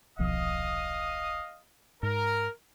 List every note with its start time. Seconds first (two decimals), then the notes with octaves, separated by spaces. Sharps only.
0.19 D#1 B1 F3 D#5 F5 D#6
2.03 G#2 A#4